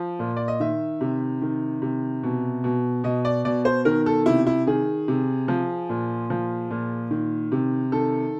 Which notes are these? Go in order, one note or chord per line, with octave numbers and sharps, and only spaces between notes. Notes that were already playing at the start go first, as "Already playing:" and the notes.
Already playing: F3
A#2
D5
D#5
D#3 E5
C3
D#3
C3
B2
B2
B2 D#5
D5
B2 D5
C5
D#3 A#4
A4
C3 E4
E4
D#3 G#4
C3
F3
A#2
F3
A#2
D#3
C3
D#3 A4